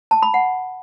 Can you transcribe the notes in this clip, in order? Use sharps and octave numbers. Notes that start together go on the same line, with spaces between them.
A5
B5
F#5